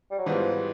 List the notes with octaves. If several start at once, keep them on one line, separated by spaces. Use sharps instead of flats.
G3
F#3
G#2 E3 F3 G3 B3